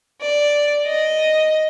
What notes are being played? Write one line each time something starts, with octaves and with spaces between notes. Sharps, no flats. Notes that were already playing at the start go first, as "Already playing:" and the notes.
D5
D#5